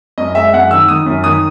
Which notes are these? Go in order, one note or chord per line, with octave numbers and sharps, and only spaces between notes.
F#2 D#5
G#3 E5
F#2 F#5
D#3 E6
D#3 D#6
F#2
D#3 D#6